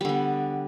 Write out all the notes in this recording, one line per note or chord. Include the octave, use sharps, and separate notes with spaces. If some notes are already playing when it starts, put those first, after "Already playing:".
D3 G3 B3